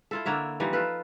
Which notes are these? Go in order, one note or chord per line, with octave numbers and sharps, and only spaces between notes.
E4 F4 A4
D3 A#3 C#5 E5
E3 F3 G3 D#4
F4 A4 B4